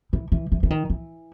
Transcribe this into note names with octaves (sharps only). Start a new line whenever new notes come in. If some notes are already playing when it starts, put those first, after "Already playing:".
E3
E3
E3
E3
D#3
E3